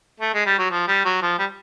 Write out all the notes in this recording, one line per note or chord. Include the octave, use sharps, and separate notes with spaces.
A3
G#3
G3
F#3
F3
G3
F#3
F3
G3